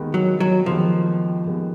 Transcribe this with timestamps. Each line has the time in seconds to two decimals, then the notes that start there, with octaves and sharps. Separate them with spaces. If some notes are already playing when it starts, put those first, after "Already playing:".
Already playing: D#2 D#3 G#3 B3
0.14 F#3
0.40 F#3
0.66 D#2 D#3 F3 G#3 B3
1.46 D#2 D#3 G#3 B3